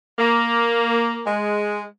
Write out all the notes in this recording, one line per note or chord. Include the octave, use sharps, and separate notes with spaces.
A#3
G#3